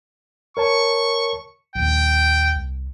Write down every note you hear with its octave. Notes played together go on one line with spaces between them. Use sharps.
A#4 C#5 A5 C#6
A#1 D#2 G5
C2